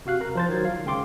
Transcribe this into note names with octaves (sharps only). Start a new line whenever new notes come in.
C3 F#4 F5 F#6
A#4 A#5
F3 C5 A6
D#3 F#3 G#6
F4 F5
C#2 C#3 G5 C6 D6